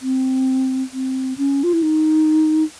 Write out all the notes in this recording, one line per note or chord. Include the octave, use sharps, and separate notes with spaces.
C4
C4
C#4
F4
E4
D#4